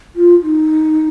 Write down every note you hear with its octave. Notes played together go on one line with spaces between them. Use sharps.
F4
D#4